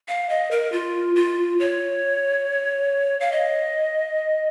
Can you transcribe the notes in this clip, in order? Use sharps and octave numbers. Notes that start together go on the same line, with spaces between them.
F5
D#5
A#4
F4
F4
C#5
F5
D#5